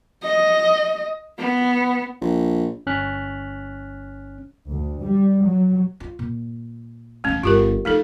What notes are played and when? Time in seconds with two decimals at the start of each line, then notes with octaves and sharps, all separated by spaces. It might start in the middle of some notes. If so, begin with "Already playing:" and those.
0.24 D#5
1.39 B3
2.21 A#1
2.86 G1 C#4 F6 F#6 B6
4.68 D2
5.02 G3
5.44 F#3
6.00 F4
6.19 A#2
7.24 A#1 E2 A3 C#4
7.43 G1 F4 G4 A#4
7.85 F3 A3 D#4 A4